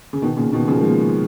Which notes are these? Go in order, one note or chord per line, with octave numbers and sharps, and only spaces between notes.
C#3
B2 D#3
A#2 C#3
B2 D#3
C#3 F3
A#3
F3 G#3